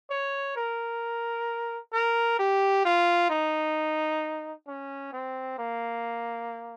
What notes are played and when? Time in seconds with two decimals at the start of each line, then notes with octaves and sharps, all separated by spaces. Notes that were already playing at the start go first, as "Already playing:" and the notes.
0.10 C#5
0.56 A#4
1.93 A#4
2.39 G4
2.85 F4
3.30 D#4
4.68 C#4
5.12 C4
5.59 A#3